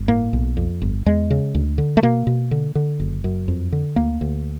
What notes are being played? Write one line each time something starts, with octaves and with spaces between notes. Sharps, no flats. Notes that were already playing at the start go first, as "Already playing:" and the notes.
Already playing: G1
A2 A#3
B1
F2
G1
E2 G#3
C#3
D2
D3
A3
B2 A#3
B2
D3
D3
F#1
F#2
F2
D3
D2 A#3
D2